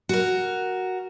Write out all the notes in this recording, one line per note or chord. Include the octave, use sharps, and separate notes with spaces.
F#4 A#4